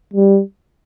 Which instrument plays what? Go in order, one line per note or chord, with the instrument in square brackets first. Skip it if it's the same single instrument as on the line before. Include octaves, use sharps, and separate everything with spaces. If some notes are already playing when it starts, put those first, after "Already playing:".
[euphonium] G3